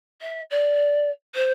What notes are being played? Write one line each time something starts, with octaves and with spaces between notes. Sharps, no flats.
E5
D5
C5